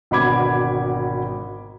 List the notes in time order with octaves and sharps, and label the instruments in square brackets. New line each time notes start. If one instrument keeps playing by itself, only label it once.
[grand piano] G#1 B2 D3 B5 D6 G#6